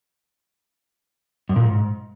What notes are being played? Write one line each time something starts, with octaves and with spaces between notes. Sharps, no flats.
F#2
A#2
G#2